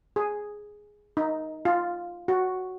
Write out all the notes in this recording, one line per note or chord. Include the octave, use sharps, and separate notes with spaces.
G#4
D#4
F4
F#4